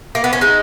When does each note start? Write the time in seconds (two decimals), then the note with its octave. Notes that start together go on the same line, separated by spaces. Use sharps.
0.15 A#3
0.24 B3
0.33 C#4
0.41 G#3 D#4